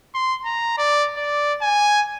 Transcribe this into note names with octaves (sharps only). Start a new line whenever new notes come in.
C6
A#5
D5
D5
G#5